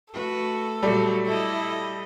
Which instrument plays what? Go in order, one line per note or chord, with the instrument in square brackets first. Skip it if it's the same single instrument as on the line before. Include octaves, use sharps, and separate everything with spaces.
[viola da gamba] A3 F#4 B4 [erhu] A4
[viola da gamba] A#2 F#3 F#4 [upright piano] G3 A3
[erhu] E4 [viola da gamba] A4 D#5